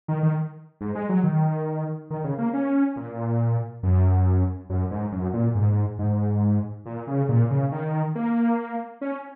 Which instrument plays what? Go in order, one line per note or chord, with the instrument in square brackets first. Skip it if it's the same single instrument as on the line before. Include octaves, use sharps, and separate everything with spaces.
[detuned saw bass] D#3
D#3
G#2
G#3
F#3
D#3
D#3
C#3
A#3
C#4
A#2
F#2
F#2
G#2
F#2
A#2
G#2
G#2
A#2
C#3
A#2
C#3
D#3
A#3
C#4